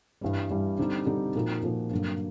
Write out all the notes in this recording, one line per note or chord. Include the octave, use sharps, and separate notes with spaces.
G2 E3 G3
G2 E3 G3
D3 G3 C4 D#4 G4
D3 G3 C4 D#4 G4
A#2 F3 A#3 D#4 F#4
A#2 F3 A#3 D#4 F#4
G2 D3 F#3 A#3